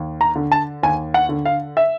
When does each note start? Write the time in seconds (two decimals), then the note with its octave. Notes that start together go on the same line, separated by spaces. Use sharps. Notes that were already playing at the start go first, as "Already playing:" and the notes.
Already playing: D#2
0.21 A#5
0.36 D3
0.52 A5
0.83 D#2 G#5
1.14 F#5
1.29 D3
1.45 F5
1.77 E5